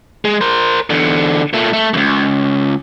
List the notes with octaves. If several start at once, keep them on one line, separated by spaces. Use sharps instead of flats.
G#3
A#4 C5
E2 D3
A#2 A3
A3
C#2 F#2